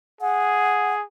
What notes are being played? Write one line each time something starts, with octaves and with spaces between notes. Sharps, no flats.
G#4 F#5